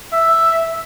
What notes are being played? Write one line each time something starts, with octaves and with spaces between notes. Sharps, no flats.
E5